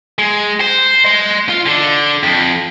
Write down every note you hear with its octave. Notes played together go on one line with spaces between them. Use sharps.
G#3
C5
D#5 C6
F4
D3
F2